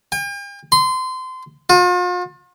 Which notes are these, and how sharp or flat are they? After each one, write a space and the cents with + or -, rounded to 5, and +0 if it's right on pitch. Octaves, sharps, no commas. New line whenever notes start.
G5 +45
C6 -25
F4 +40